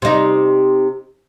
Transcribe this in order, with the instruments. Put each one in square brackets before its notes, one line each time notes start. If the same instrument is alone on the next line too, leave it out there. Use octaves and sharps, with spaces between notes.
[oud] C3 D#4